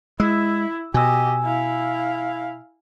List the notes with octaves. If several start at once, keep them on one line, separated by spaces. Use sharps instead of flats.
G#3 E4 E6
B2 G4 D#5 G#5 E6
E4 F5